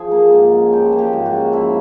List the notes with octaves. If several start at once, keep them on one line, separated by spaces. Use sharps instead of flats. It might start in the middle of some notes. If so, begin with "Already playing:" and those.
Already playing: F3 G#4
A#3
G#2
C#4
F3 G4
A#3
G4
G#2
F#4
C#4
F3 E4